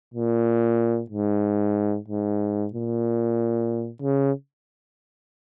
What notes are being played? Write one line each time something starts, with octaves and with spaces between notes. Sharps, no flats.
A#2
G#2
G#2
A#2
C#3